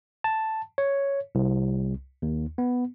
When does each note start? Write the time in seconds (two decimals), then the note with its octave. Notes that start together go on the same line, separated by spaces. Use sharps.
0.24 A5
0.78 C#5
1.35 C2
2.22 D#2
2.58 B3